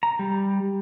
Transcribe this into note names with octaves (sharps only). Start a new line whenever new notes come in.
A#5
G3